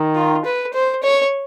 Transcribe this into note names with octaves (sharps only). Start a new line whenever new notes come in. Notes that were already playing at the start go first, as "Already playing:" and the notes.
Already playing: D#3
F4
B4
C5
C#5